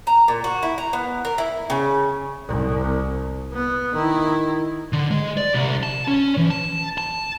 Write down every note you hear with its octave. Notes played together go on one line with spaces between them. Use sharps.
A#5
A#2
F#4
E4
A#5
B3
A#4
E4
C#3
C2
B3
D#3 E4
D3
G#3
D5
C2
A5
C#4
E3
A5
A5